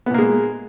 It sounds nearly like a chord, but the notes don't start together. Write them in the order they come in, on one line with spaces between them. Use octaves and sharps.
B3 A#2 A#3 G#3